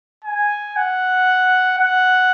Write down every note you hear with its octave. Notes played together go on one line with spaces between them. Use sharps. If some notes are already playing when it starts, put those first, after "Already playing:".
G#5
F#5
F#5